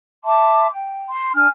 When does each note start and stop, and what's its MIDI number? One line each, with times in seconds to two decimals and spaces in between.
0.24 0.67 76
0.24 0.67 81
0.24 0.67 84
0.24 0.67 86
0.72 1.08 79
1.08 1.29 84
1.34 1.46 62
1.34 1.46 80
1.34 1.46 89